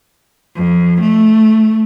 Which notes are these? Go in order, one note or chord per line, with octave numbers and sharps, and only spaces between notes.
F2
A3